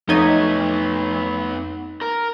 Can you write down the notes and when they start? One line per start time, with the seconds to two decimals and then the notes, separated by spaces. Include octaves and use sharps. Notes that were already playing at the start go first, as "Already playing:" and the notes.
0.09 F2 A3 B3 D#4 C#5 G#6
2.01 A#4